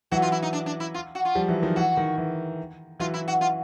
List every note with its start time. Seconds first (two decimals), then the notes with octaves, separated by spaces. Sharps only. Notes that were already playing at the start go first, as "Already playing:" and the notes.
0.11 E3 F#3 F#4
0.22 F4
0.32 E4
0.42 D#4
0.53 D4
0.66 D4
0.80 E4
0.94 F4
1.15 F#4
1.25 F4
1.35 F3 G3
1.48 E3 F#3
1.62 D#3 F3
1.76 E3 F#4
1.97 D#3
2.18 E3
3.00 E3 F#3 F4
3.14 E4
3.28 F#4
3.41 F4